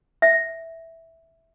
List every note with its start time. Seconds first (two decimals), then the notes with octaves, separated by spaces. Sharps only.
0.22 E5